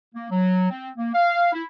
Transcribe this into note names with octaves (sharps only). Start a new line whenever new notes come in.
A#3
F#3
C4
A#3
F5
E4